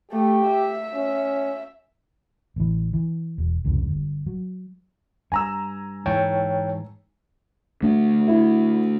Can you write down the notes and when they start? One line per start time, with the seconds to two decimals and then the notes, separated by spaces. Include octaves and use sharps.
0.11 A3 G4
0.47 E5
0.95 C#4
2.56 A1 E3
2.93 E3
3.38 E1
3.65 C2 F2 G#2 C#3
3.89 G1
4.27 F#3
5.32 G2 G#5 A#5 E6
6.06 G#2 E3 C#5 G5 A5
7.83 A3 D4
8.28 E4